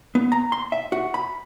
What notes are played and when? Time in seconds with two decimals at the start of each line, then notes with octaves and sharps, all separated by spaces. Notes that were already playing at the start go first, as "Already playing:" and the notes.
0.15 B3
0.32 A#5
0.52 C6
0.72 E5
0.92 F#4
1.14 B5